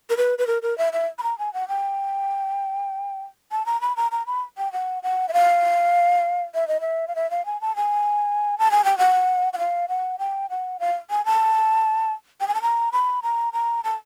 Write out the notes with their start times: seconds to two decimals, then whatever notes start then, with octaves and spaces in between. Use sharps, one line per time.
0.10 A#4
0.17 B4
0.38 B4
0.47 A#4
0.62 A#4
0.78 E5
0.93 E5
1.18 B5
1.23 A#5
1.39 G#5
1.54 F#5
1.68 G5
3.52 A5
3.66 A#5
3.81 B5
3.97 A#5
4.12 A#5
4.27 B5
4.58 G5
4.73 F#5
5.03 F#5
5.29 E5
5.33 F5
6.54 E5
6.68 D#5
6.81 E5
7.08 F5
7.16 E5
7.31 F5
7.46 G#5
7.61 A5
7.76 G#5
8.59 A5
8.71 G#5
8.84 G5
8.98 F#5
9.53 F#5
9.58 F5
9.89 F#5
10.19 G5
10.50 F#5
10.80 F5
11.10 G#5
11.26 A5
12.41 G5
12.48 G#5
12.55 A5
12.62 A#5
12.93 B5
13.23 A#5
13.53 A#5
13.84 A5